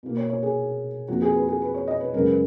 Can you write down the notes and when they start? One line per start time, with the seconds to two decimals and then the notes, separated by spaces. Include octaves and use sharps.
0.03 B2 A#3
0.17 C#5
0.30 C#5
0.43 G#4
1.08 F2 F3 A#3 F#4
1.22 G#4
1.35 B4
1.48 G#4
1.62 B4
1.74 C#5
1.88 D#5
2.00 B4
2.14 F#2 C#3 G#3 B3 A#4
2.28 B4